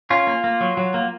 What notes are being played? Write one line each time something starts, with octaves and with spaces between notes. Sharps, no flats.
C#4 F4
A#3
A#3
F#3
F#3
A#3